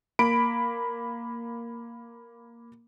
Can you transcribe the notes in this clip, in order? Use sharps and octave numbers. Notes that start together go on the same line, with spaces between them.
A#3 B5 D7